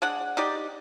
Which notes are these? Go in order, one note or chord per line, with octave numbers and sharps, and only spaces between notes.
G#3 D4 F#5
D#4 G4 D5